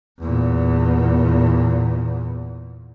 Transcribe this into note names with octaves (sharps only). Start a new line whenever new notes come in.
E2 A#2